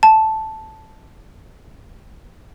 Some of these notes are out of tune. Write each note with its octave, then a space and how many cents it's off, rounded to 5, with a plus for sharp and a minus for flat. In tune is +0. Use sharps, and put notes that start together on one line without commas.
A5 -5